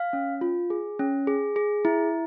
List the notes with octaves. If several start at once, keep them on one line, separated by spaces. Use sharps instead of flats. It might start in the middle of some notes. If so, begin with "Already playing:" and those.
Already playing: F5
C#4
F4
G#4
C#4
G#4
G#4
E4